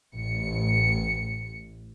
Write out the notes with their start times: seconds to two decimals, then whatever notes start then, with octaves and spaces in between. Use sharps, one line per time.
0.12 A1 C#7